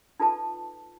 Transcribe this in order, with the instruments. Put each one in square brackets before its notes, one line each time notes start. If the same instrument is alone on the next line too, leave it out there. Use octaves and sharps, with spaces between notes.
[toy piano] D#4 F4 A4 B4 A5